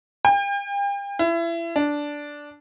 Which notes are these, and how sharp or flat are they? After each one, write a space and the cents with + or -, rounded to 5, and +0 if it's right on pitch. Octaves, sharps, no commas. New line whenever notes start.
G5 +40
E4 +30
D4 -5